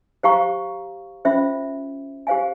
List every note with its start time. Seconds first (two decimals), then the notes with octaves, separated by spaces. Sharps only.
0.23 G4 C5 F5 A#5 C#6
1.25 C#4 F4 C5 E5
2.27 G4 C5 F5 G#5